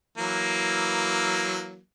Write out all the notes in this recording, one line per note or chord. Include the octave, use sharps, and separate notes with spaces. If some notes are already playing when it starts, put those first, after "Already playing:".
E3 F#3 A#3